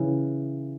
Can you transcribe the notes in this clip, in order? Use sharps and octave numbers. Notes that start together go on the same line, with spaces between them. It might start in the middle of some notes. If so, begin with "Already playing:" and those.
Already playing: C#3 E3